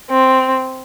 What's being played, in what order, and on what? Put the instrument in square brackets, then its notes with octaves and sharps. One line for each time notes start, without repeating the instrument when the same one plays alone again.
[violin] C4